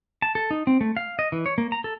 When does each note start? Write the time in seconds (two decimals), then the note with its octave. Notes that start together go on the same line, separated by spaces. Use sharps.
0.22 A5
0.35 A4
0.51 D#4
0.67 C4
0.81 A3
0.97 F5
1.19 D#5
1.32 E3
1.46 C#5
1.58 A#3
1.72 A#5
1.84 A4